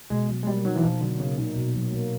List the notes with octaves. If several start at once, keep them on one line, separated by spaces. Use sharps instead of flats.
B2 G#3
F#3
G#3
G3 A#3
F#3 D#4
E3
B2 F3
D3 F#3
C#3 A#3
A#2 D#4
B2
F#3
A#3